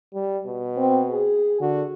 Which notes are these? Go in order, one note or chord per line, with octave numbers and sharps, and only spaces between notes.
G3
B2
C4
G#4
D3 F#4